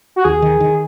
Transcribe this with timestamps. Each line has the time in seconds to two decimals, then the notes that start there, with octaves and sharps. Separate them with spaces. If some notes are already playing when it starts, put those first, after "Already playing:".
0.16 F#4
0.25 D#2 G#4
0.42 D#3
0.60 D#3